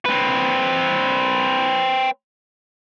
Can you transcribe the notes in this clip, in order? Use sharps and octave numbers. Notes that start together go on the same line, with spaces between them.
C4 B4